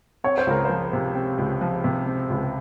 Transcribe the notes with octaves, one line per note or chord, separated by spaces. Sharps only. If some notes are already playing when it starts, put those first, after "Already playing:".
C4 C#5
C5
C#2 A#4
F3 C5
C3
C4
C#2
F3
C3
C4
C#2